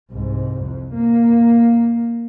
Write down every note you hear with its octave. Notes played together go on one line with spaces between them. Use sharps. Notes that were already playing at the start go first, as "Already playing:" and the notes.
C2 G#2
F2
A#3